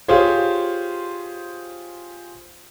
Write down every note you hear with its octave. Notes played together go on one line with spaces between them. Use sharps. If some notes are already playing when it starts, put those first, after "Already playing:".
F4 G4 G#4 C5 C#5